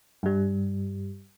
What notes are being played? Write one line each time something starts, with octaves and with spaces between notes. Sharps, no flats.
G2 G3